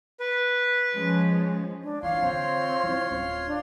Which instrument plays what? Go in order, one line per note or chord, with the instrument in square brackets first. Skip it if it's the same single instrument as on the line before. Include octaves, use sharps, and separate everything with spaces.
[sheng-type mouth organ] B4
[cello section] F3 G#3 C#4
[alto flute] D4
[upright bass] E3 [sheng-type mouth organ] F4 C#5 C6 [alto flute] F5
[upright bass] D3 [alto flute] C4
[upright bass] C#4 E4
D1 C#4
[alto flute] D4